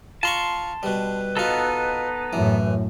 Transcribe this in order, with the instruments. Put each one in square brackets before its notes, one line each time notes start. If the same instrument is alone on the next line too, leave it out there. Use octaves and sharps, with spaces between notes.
[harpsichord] F4 A#5 C#6 [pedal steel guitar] A5 C6
[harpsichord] B2 G3 [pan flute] B4
[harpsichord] B2 F4 [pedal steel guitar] B3 D#4 A4
[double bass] F#2 A2 [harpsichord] E3